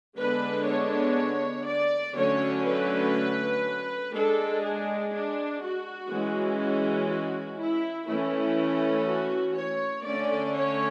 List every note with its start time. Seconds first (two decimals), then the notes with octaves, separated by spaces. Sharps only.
0.18 D3 G#3 B3 D4 B4
0.68 C#5
1.67 D5
2.16 D3 F#3 A3 C#4 C#5
2.66 B4
4.13 G#3 D4 A4
4.63 G#4
5.13 D4
5.62 F#4
6.11 E3 G#3 C#4
6.60 F#4
7.10 F#4
7.59 E4
8.08 E3 A3 C#4 E4
9.07 F#4
9.57 C#5
10.05 D3 A3 C#4 D5
10.55 C#5